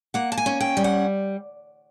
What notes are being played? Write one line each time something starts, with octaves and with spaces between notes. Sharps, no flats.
A#3 F#5
A5
G#5
C#4
G5
G3
F#5